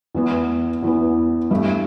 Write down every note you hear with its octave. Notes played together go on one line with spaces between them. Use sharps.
E2 E3 B3
E2 E3 B3
G2 E3 A3 E4